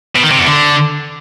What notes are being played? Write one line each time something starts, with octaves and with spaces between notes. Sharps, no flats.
B2
D#3
C3
E2
D3